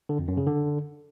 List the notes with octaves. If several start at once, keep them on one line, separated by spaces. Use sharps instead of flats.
D3
F2
F#2
C#3
D3